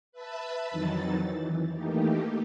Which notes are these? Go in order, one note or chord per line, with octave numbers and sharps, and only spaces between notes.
B4 E5 A5 B5
F2 D#3 E3 F#3 D#4 A6
E3
E3 A3 A#3 D#4 G4